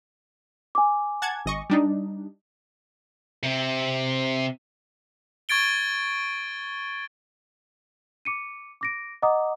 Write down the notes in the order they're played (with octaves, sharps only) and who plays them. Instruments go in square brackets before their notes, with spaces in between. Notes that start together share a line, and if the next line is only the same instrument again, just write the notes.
[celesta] G#5 D6
[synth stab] F#5 A5 G#6
G#1 D#5 C#6
G3 D4 D#4
[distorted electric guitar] C3
[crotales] C#6 G#6 A6 D7 G7
[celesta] D6 C#7 D#7
D6 A#6 D7
D#5 F#5 A#5 D6 D#6